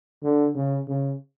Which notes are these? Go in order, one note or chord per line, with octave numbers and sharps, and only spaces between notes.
D3
C#3
C#3